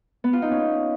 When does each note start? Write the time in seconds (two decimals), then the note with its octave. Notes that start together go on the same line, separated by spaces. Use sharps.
0.24 B3
0.33 F4
0.42 D#4
0.51 C#4